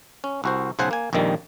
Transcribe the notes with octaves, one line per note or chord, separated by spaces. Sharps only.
C#4
C2 F#4 C5
B1 C#3 C5 F#5 G#5
A#3 G#5
A#1 F2 A#2 D#3 G3